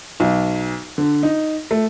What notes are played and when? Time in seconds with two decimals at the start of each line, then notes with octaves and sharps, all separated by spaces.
0.20 B1
0.98 D3
1.23 D#4
1.71 A3